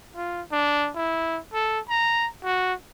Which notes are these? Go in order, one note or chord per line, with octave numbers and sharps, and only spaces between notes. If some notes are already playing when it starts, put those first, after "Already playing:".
F4
D4
E4
A4
A#5
F#4